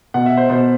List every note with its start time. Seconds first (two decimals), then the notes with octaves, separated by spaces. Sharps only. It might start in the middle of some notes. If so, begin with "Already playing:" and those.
0.14 B2 F#5
0.26 E5
0.37 C5
0.49 B2 C5